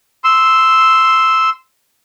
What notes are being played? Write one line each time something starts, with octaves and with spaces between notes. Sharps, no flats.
C6 E6